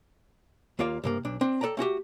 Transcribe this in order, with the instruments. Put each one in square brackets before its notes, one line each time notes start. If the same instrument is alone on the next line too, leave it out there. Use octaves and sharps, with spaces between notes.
[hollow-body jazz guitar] D#2 A#3 F4 D5 F5
G2 C3 A#3
B1 D4
C4 D4
A4 B4 D5 G5 A#5
A3 C#4 F#4 G4